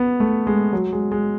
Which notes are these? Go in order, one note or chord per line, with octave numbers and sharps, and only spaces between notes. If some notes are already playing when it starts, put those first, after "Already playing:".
Already playing: B3
A3
G#3
F#3
G#3
G#3